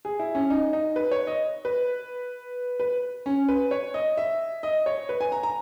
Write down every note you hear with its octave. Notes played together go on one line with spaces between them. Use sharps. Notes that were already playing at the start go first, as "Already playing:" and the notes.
G#4
E4
C#4
D#4
D#4
B4
C#5
D#5
B4
B4
C#4
B4
C#5
D#5
E5
D#5
C#5
B4
G#5
A#5
A#5